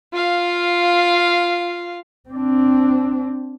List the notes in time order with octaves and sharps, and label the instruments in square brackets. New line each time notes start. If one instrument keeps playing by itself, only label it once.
[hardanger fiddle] F4 F5
[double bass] C4 D4